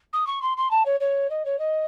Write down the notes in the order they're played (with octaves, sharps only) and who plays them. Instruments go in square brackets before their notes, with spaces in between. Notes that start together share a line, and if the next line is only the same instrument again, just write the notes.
[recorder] D#6
C#6
C6
C6
A5
C#5
C#5
D#5
C#5
D#5